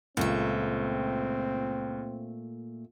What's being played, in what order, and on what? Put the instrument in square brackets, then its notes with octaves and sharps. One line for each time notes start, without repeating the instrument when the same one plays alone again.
[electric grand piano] C#2 [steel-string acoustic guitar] A#2 A3 E5 [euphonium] C4